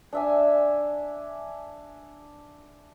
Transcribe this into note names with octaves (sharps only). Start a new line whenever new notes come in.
D4 E5 G#5